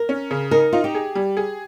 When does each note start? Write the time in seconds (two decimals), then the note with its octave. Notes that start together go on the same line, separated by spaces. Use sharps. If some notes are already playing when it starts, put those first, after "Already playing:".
Already playing: A#4
0.09 C#4
0.31 C#3
0.51 D#4 A#4
0.73 D#4 F4
0.84 G4
0.95 G#4
1.15 G3
1.37 G#4